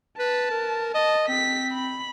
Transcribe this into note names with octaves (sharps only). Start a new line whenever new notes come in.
B4 A5
A#4
D#5 A5
C4 B6
B5